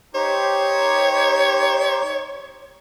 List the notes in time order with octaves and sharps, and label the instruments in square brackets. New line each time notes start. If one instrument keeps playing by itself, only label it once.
[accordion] D#4 G4 C5 [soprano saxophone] C#5